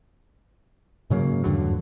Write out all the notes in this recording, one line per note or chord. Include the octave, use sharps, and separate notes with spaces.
G#2 C#3 F#3 A#3
E2 G2 D3 F#3